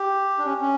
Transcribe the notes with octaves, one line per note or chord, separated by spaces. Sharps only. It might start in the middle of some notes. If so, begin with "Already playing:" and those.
Already playing: G4
D4
C#4
C#4